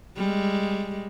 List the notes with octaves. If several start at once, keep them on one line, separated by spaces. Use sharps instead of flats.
G3 G#3